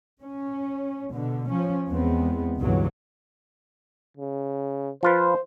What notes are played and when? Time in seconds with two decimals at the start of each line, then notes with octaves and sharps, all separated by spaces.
0.22 C#4
1.11 B2 D3
1.50 F3 C#4
1.87 E2 G#3 B3 C4
2.59 C#2 G2 B2 E3 F#3
4.17 C#3
5.03 F3 F4 B4 C5